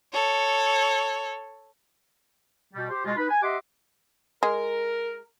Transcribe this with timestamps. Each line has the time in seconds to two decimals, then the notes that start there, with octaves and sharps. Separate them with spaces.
0.13 A4 C#5
2.74 B2 G3
2.89 G4 C5
3.05 B2 G#3 F4
3.17 D#4 B4 B5
3.29 G#5
3.42 G4 D#5 E5 F#5 C6 D6
4.43 G#3 A#4